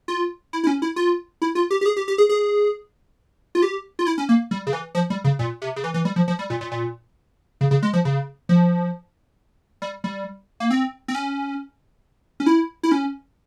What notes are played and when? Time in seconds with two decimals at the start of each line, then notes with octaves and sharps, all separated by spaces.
0.08 F4
0.53 E4
0.64 E4
0.67 C#4
0.82 E4
0.96 F4
1.42 E4
1.55 F4
1.71 G4
1.81 G4
1.86 G#4
1.96 G4
2.08 G4
2.18 G#4
2.29 G#4
3.55 F4
3.62 G4
3.99 F4
4.07 E4
4.18 C#4
4.29 A#3
4.51 G3
4.67 C#3
4.73 E3
4.95 F3
5.10 G3
5.24 C#3
5.39 A#2
5.62 C3
5.76 C#3
5.84 E3
5.94 E3
6.05 G3
6.16 F3
6.28 F3
6.39 G3
6.50 A#2
6.61 A#2
6.72 A#2
7.61 C#3
7.71 C#3
7.83 G#3
7.93 F3
8.05 C#3
8.49 F3
9.82 G3
10.04 G3
10.60 A#3
10.71 C4
11.08 C4
11.15 C#4
12.40 C#4
12.46 E4
12.83 E4
12.92 C#4